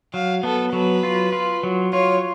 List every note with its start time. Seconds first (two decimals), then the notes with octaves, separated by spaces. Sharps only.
0.14 F#3 F5
0.43 B3 A4
0.73 F#3 B4
1.03 F4
1.32 F4
1.63 F#3
1.93 F4 C#5